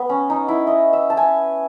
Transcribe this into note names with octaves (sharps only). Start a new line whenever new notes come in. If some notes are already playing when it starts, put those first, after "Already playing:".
Already playing: B3
C#4
D#4
E4
D#5
E5
A5
G#5